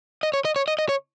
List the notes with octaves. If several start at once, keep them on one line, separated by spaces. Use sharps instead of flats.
D#5
C#5
D#5
C#5
D#5
D#5
C#5